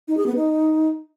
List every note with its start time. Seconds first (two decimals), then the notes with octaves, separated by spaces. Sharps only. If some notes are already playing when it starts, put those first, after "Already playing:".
0.08 D#4
0.17 G#4
0.26 B3
0.35 D#4